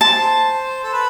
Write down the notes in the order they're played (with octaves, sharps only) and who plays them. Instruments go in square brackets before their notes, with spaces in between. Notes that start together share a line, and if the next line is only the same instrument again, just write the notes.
[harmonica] C5 [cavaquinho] A5
[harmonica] A4
B4